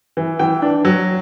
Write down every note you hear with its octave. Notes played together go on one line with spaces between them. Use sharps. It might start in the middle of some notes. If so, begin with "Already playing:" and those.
E3
E3 G5
D4
F#3